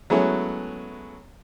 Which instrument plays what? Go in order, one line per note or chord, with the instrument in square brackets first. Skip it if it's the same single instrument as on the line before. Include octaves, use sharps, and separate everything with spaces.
[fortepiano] F#3 G#3 A3 B3 C#4 E4